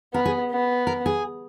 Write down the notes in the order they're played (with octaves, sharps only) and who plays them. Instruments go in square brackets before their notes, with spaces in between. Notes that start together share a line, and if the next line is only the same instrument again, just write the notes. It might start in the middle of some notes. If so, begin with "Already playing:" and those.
[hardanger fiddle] B3 [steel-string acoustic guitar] A#4
[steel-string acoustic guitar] G#4
[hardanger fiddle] B3
[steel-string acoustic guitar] A#4
G#4